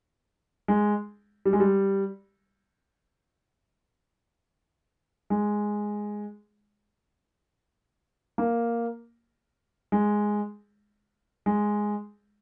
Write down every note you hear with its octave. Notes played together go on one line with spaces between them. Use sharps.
G#3
G3
G#3
G3
G#3
A#3
G#3
G#3